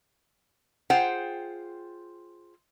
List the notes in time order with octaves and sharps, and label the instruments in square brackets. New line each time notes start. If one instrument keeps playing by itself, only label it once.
[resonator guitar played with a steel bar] F4 G#4 C5 F#5 G5